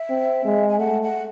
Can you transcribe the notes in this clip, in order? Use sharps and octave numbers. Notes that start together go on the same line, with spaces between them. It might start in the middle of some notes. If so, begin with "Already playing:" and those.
Already playing: E5
C4
G#3
G#5
A3 F#5
F#5